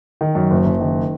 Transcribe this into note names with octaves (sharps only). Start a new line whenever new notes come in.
D#3
F#2
F#1
F#1
D#3